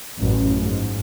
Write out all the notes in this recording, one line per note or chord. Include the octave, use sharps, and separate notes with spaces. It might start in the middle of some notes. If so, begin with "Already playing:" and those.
A1 F#2
G#2